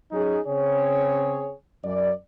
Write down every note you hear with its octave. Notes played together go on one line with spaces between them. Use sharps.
F#3 C#4 D#4 G#4
C#3 C4 G#4 C#5
F#2 D5